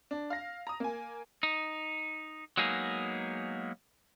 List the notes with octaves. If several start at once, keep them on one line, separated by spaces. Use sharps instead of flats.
D4
F5 A#6
A#5 D#6
A#3 G#5
D#4
F#3 G#3 A#3 B3 D#4 G#4